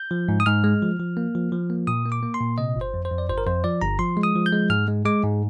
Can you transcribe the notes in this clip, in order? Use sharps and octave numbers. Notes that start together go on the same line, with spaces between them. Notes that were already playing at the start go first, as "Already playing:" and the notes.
Already playing: G6
F3
G#2
D#6
G#2 F6
G#3
F3
F3
A#3
F3
F3
A#3
A#2 D#6
A#3
D6
A#3
C6
A#2
C3 D#5
G1
C5
F2
C5
F2
D5
G1 C5
A#4
F2 C5
F3 D5
G1 A#5
F3 C6
G#3
D#6
F3
G6
G#3
G#2 F6
G#3
G#3 D6
G#2